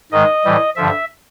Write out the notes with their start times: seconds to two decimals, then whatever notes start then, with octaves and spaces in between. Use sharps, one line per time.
0.12 G#2 D#3 G#3 D#5
0.44 A2 E3 G3
0.76 G2 D3 F3 E5